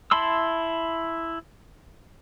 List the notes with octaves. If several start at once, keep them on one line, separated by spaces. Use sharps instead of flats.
E4 A5 B5 C6 E6